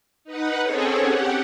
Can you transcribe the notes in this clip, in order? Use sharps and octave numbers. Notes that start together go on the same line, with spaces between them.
D#4 B4 F#5
C4 C#4 G#4 A4 C#5
G4 F#5